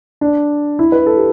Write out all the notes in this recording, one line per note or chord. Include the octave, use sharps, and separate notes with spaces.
D4
E4
B4
A4
G4